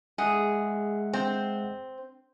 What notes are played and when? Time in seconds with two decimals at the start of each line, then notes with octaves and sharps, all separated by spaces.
0.18 G#3 G#4 E5 F#5
1.13 C4